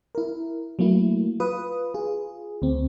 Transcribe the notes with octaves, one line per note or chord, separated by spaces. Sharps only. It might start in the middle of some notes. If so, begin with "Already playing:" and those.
E4 A#4
F#3 A3 A#3 E4
F4 B4 D#6
F4 G#4
D2 C4